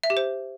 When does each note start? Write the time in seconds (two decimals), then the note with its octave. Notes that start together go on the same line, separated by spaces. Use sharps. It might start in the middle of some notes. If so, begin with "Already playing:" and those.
0.04 E5
0.10 G4
0.17 C5